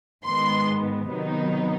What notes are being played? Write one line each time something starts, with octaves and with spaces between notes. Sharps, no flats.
G#2 D#3 G#3 B3 C6
C3 D#3 F#3 B3 D#4